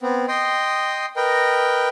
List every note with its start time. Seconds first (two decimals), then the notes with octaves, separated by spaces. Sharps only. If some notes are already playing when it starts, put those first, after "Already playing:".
0.01 B3 C4
0.28 D#5 G5 C6 D#6
1.16 A#4 B4 D#5 G5